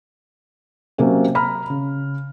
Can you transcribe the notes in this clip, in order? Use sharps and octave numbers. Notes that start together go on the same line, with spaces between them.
C3 F#3 A#3 C#4
A#5 B5 F6
C#3